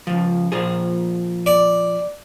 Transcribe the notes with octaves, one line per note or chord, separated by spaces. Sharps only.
C#2 F3
A#2 F3 G#4
D5